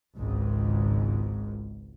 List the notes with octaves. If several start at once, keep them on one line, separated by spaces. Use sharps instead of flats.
G#1 C#2 G#2